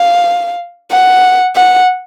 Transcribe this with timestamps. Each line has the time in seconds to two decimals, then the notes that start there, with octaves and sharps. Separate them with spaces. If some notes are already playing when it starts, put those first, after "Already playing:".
Already playing: F5
0.91 F#5
1.56 F#5